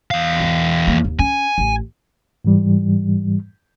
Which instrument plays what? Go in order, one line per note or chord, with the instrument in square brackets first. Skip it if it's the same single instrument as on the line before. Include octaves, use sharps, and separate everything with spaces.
[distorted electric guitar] E2 F5
[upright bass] G#2
F3 A#3
D#2
[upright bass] C#4 [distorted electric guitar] G#5
[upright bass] A1
[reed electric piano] G#2 E3 G3